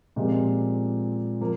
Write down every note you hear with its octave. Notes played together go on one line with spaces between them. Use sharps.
A#2 F3 G#3 C4 G4
F3 A#3